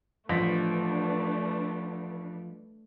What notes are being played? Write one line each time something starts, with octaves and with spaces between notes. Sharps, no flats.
A1 F3 A3 D4 B4 A#6 B6